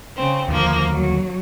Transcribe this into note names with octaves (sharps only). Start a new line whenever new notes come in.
C#3 C4
D#2 D3 F3 A#3
F#3